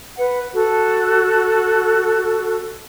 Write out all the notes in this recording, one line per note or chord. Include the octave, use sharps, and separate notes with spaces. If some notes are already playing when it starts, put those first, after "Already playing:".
B4 F#5
F#4 A4